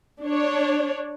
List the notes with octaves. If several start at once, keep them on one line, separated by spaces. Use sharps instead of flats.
D4 C#5